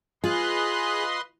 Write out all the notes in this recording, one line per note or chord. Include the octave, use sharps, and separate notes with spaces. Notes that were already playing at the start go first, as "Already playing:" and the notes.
F4 G#4 B4 D#5 C6 F#6